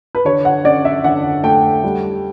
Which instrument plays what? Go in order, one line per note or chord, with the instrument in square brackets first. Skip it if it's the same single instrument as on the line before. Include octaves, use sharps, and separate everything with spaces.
[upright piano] B4
D3 C#5
F#5
C#4 D5
E5
D3 F#5
A3 G5
G3